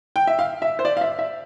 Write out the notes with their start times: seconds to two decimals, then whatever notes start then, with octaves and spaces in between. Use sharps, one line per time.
0.16 G5
0.27 E5
0.39 F5
0.62 E5
0.79 C5
0.85 D5
0.97 F5
1.01 E5
1.19 E5